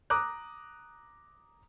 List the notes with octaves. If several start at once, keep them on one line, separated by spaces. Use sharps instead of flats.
A#5 D6 D#6 F#6